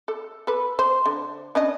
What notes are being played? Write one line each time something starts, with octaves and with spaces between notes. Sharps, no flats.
A4
A4 B4
C5
D3
C#4 D4 D#5